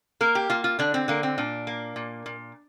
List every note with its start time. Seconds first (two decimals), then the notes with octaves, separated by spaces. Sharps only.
0.21 A#3 A#4
0.35 G4
0.50 A#3 F4
0.64 F4
0.79 D3 D4
0.94 C4
1.08 D3 A#3
1.23 C4
1.38 A#2 D4
1.67 A#3
1.96 A#2
2.26 A#2